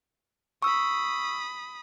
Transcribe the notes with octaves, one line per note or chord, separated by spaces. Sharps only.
B5 C#6 D#6 E6